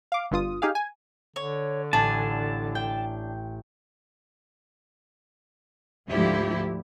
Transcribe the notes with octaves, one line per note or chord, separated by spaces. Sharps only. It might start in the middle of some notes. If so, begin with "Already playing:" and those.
F5 D6
G1 G2 F4 D#6
D#4 G4 G#4 F5
G#5
D3 C#5
A1 D4 G#5 A5
G5
D2 G#2 F3 E4 G4